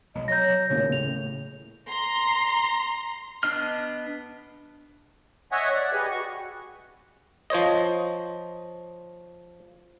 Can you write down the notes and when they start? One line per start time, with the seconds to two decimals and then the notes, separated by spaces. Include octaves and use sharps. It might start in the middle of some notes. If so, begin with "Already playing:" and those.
0.15 B1 F#3 D#5
0.28 F#3 C#5 A#5 G6 A#6
0.70 A1 D#2 A#2 C#3
0.92 A2 F7
1.88 A#5 C6
3.43 B3 D4 D#5 F6
5.52 C#5 D#5 E5 F#5 G#5
5.76 D5 F#5
5.93 G4 G#4 B4 D#5 G#5
6.10 F#4 C#6
7.50 F3 C5 C#5 D#5